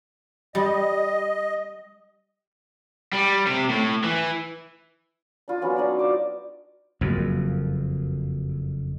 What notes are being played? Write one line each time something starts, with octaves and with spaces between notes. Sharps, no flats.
G3 D#5
G3
C3
A2
E3
D4 F4
F#3 B3 C#4 F4
D4 D#4 C#5 D5
C5 D6
F#1 F2